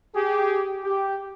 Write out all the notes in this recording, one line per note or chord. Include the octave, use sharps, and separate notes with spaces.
G4 G#4
G4